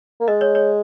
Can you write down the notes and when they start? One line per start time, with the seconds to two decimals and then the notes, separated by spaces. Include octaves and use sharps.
0.20 A#3
0.28 G#3 D#5
0.41 C#5
0.55 C#5